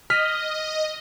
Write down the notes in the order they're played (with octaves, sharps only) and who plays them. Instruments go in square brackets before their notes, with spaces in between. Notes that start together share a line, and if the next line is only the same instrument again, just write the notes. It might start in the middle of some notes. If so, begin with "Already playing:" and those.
[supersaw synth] D#5 [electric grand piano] F6 B6